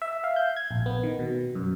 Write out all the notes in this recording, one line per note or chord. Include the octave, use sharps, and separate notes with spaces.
E5
F5
G6
G#6
A#1
B3
D#3
B2
F#2